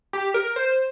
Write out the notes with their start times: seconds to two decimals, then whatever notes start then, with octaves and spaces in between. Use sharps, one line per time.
0.13 G4
0.34 A#4
0.56 C5